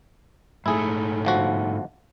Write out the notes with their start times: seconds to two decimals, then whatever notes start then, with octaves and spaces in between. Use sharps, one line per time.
0.66 G#2 A3 E4 G#4
1.25 G1 F3 F#4